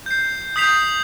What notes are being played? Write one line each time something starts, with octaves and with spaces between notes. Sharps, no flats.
G6 C7
D#6 G6 B6 C7 F7